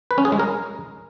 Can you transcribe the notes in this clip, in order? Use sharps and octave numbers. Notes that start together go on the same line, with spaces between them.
B4
C#4
G#4
G#3
A#4